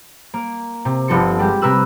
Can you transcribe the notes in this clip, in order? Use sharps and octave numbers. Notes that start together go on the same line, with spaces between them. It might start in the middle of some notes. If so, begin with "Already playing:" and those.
A#3
C3
G1 G2 F3 A4 C5 C#7
G3 G#3 G4
C3 A#4 B4 E6 F#6